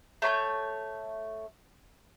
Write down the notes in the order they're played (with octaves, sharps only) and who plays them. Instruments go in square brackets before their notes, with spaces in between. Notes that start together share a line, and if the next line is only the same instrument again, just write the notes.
[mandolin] A3 C#5 B5 G6